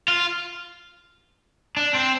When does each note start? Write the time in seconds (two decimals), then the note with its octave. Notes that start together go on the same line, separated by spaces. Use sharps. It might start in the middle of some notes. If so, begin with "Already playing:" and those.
0.08 F4
1.77 D4
1.95 C4